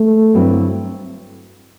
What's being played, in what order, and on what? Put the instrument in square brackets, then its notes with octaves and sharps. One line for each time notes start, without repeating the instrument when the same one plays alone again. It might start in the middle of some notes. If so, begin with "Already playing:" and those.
Already playing: [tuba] A3
[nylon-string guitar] G2 D3 F#3 C4 E4